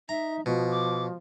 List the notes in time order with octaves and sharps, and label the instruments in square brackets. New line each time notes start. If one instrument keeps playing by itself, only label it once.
[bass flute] D#4 [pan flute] E5 [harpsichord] A#5
[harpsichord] B2 [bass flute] F3 [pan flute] F4
[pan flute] D6